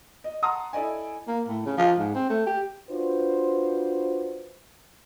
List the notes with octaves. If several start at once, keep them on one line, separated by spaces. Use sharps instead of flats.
D#5
F#5 A5 A#5 C6 D#6
E4 A4 D5 D#5 G#5
A#3
A2
C#3
F3
G#2
C4
A3
G4
D4 F4 F#4 B4 C5